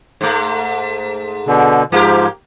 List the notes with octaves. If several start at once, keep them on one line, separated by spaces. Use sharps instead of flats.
G#2 A3
B2 D3
G#2 F3 A#3 G4